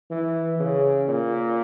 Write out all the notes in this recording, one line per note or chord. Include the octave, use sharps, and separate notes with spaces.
E3
C#3
A#2